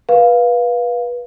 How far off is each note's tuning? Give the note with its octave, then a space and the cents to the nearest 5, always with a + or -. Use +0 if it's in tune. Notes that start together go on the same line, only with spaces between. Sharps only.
B4 -20 F5 +0